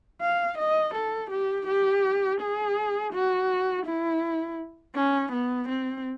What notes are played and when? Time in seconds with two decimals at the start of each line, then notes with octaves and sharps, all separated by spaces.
0.22 F5
0.58 D#5
0.95 A4
1.31 G4
1.68 G4
2.41 G#4
3.14 F#4
3.87 E4
4.96 C#4
5.33 B3
5.69 C4